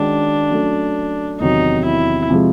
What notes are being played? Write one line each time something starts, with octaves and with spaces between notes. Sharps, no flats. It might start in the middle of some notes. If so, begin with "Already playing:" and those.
Already playing: D#3 G#3 C#4 D4 F#4
F#3 A3 C#4
E2 C3 D#3 F#3 D#4
E4
C3 F3 G#3